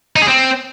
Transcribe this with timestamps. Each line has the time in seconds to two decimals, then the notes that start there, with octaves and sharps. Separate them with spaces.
0.16 D#4
0.22 G#4
0.28 C4